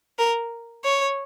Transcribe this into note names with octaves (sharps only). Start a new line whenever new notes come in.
A#4
C#5